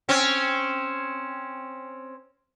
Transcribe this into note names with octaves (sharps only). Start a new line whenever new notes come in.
C4 C#4